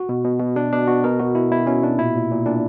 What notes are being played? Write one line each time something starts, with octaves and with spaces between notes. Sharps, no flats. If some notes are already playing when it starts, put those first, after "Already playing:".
Already playing: F#4
B2
B2
B2
B2 D4
B2 D4
B2 F#4
B2 A#4
B2 F#4
B2 E4
B2 E4
B2 C#4
B2 D4
A#2 E4
A#2
A#2
A#2 D4